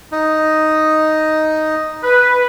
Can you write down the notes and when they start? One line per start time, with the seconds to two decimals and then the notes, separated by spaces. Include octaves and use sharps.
0.12 D#4
2.04 B4